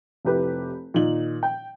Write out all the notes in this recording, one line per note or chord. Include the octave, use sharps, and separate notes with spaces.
F1 E4 G4 B4
A#2 D#3 D#4 F#7
G5